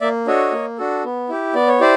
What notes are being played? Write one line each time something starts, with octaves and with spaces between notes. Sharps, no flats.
A#3 D5 E5
D4 F#4 A4 C#5 D#5
A#3
D4 F#4 A4
B3
E4 G4
B3 D5
C#5
E4 G4 C5 D5